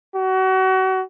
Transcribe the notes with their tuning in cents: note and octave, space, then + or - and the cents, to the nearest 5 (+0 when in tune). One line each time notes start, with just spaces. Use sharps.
F#4 +30